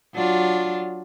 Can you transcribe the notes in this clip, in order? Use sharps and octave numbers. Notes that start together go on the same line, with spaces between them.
F#3 D4 F4